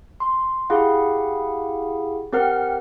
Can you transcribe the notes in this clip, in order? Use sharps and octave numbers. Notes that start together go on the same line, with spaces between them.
C6
E4 G4 G#4 F5 F#5
C4 G4 A#4 F#5 F6